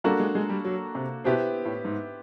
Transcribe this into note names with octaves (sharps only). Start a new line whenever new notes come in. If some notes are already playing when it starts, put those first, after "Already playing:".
G3 A#3 D4 F#4 A4
G#3
G#3
G3
F#3
C3
B2 B3 E4 G4 C5
A2
G#2